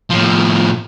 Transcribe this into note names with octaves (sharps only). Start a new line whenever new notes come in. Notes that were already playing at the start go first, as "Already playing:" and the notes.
A2 F3